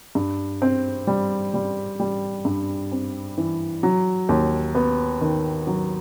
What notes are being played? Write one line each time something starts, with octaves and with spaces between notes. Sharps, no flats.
G2
C4
G3
G3
G3
G2
C4
E3
F#3
D#2
B3
D#3
F#3